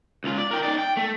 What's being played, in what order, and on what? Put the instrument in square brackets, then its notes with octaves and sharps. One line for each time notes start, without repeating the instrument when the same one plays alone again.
[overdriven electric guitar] C#2 F4
D5
A#4 G5
D#4 D5
G5
A3